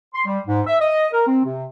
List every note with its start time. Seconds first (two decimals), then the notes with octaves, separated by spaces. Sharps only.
0.15 C6
0.26 G3
0.46 G#2
0.67 E5
0.80 D#5
1.13 A#4
1.27 C4
1.45 C3